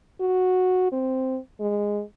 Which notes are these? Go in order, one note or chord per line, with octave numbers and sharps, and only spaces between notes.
F#4
C4
G#3